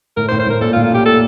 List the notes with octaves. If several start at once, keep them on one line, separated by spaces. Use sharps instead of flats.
A2 A#4
C5
A2
C5
A2 A#4
A#2 A4
F4
A2
F4
A#2 G4
A4